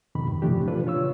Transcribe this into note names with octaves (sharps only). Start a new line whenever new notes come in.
F2 B2 D#3 B5
G2
C3 E3 F3 A3 D4 G4
A#2 D4 F4 A4 B4
C#3 F4 C#5 E6